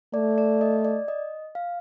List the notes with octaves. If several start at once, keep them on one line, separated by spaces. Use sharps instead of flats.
A3 D5
D5
D#5
D5
D#5
F5